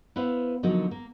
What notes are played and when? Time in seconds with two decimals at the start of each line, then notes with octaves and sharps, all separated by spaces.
0.16 B3 E4 B4 C5 F5
0.63 D3 F3 F#3 A#3 D#4 F#4
0.91 A#3